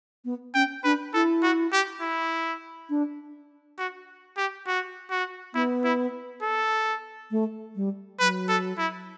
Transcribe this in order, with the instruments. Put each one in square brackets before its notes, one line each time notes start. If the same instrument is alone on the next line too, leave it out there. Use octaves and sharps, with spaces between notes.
[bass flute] B3
[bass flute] C#4 [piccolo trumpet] G5
[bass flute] D4 [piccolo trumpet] B4
[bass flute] E4 [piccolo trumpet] A4
[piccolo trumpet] F#4
G4
E4
[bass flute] D4
[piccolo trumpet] F#4
G4
F#4
F#4
[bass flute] B3 [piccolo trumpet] E4
[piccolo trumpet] E4
A4
[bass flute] A3
G3
[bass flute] F#3 [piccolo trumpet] B4
[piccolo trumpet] A4
E4